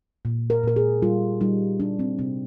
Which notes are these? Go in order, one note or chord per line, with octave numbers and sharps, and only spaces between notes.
A#2
A#4
A#2 A#4
G#4
G3 F4
G3 D#4
G3 D4
C4
C3 C4